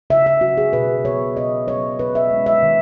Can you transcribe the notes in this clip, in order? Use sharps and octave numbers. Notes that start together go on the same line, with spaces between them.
C#3 E5
E5
F#3 C#4 F#4
G#4
B2 B4
F#3 B3 C#5
B2 D#5
F#3 B3 C#5
B2 B4
E5
G#3 C#4
E5
D#3